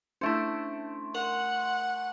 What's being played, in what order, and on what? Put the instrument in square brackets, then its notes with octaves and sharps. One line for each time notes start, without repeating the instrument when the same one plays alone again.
[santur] A3 C5 [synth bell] C#4 D4 E4
[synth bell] A#4 C6 F#7 [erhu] F#5